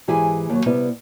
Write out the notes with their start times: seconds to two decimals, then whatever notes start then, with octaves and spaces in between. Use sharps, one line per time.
0.08 G#2 E3 E4 G4 G#4 G#5
0.50 D#2 F#3
0.66 C3 G3 B3 E4